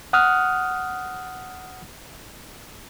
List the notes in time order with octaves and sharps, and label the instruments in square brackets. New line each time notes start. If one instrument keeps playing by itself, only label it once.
[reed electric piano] F#5 D#6 F6 F#6